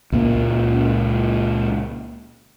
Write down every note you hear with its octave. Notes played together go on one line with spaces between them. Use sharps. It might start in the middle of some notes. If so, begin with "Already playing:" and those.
C#2 A#2 A#3